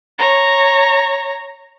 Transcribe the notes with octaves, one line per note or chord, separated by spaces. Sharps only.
C#5 A#5